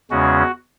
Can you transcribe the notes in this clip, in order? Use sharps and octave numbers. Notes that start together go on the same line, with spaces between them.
E2 C#3 G#3 C#4 F#4